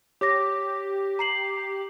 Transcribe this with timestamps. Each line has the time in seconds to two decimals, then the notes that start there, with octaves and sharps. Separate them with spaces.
0.21 G4 C#5 D6 A#6
1.19 A#5 C7 F#7